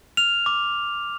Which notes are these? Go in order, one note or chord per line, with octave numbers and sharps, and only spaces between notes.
F6 F7
D6